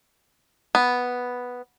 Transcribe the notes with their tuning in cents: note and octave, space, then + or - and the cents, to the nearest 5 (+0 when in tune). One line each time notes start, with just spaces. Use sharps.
B3 +0